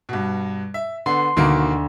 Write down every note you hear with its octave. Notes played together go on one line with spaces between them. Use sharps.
G2 B2
E5
D3 B3 C6
D2 B2 D#3 A#3